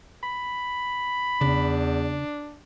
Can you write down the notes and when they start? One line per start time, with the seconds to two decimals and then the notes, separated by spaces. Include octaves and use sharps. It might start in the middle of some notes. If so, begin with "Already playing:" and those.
0.23 B5
1.41 E2 C#3 D4